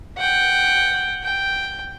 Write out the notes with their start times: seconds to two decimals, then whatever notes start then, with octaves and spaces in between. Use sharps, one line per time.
0.18 F#5 G5
1.23 G5